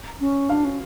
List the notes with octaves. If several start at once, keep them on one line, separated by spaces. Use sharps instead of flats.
C#4
D4 F5
C#4